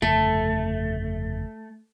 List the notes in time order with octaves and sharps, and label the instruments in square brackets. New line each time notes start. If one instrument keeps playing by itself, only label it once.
[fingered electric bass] G1 F2 C#3 [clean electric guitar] A3 [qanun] A4